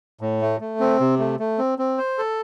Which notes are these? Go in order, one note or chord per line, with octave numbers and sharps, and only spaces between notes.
A2
A3
A3
C4
C3
A3
A3
C4
C4
C5
A4